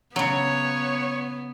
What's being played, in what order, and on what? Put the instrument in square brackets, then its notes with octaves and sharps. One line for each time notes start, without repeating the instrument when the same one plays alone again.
[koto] C#3 F#3 [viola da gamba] B3 [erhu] C#5